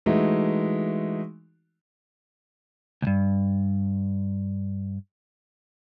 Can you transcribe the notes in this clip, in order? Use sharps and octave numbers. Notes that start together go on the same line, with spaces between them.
E3 G#3 A3 D#4 F#4
C#2 G2